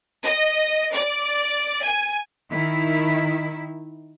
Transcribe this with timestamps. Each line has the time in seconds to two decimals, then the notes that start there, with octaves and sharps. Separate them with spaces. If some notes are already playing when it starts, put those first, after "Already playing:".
0.23 D#5
0.92 D5
1.83 G#5
2.51 D#3 E4